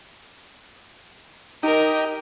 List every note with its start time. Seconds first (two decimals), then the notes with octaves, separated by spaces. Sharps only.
1.63 D#4 G4 A#4 D#5